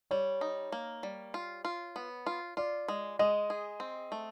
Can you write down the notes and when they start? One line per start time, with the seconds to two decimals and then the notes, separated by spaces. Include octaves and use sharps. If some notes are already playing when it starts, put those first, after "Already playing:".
0.11 G3 C#5
0.41 D#4
0.72 A#3
1.03 G3
1.34 F4
1.65 F4
1.96 B3
2.27 F4
2.57 F4 D5
2.88 G#3
3.19 G#3 D#5
3.50 G#4
3.80 C4
4.12 A3